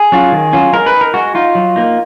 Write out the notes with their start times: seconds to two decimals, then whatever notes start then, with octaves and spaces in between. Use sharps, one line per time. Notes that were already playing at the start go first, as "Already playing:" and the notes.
Already playing: G#4
0.12 F#3 C#4 F4
0.32 D#3
0.53 F#3 C#4 F4
0.73 G#3 A#4
0.86 B4
0.94 D#4
1.01 A#4
1.14 G#3 F#4
1.35 D#4 F4
1.55 F#3
1.76 A#3 D#4